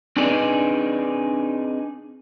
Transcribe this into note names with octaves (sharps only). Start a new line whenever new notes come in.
C4 D4 D#4 G#4 B4 D5